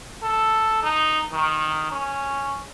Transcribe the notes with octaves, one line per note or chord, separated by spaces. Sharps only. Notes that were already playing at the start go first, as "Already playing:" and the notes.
A4
D#4
D#3
C#4